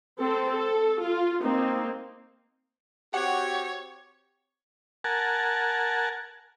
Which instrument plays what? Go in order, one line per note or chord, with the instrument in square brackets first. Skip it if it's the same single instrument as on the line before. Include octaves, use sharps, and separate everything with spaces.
[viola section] C4 A4
A4
F4
A#3 C4 D#4
[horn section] C4 F#4 G4 [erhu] C#5 [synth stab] F#5
[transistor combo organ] A#4 F#5 G#5 A5